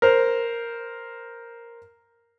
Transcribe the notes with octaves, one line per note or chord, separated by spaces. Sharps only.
A#4 C5